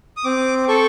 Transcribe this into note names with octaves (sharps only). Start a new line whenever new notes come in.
D#6
C4 D6
A4 C#6